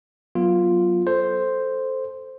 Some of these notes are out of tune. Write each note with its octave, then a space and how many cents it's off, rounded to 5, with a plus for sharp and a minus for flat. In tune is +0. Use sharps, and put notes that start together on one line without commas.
F#3 +0 B3 -25 F4 +0
A4 +0 C5 +0